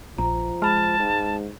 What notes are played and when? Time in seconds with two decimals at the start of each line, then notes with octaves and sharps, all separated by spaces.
0.18 A#1 F3 A#5
0.62 G#3 A5 B5 F6
0.99 G#2